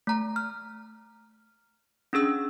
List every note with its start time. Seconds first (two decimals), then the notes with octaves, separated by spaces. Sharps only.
0.07 A3 A#5
0.36 F6
2.13 C#4 D4 G#4 E6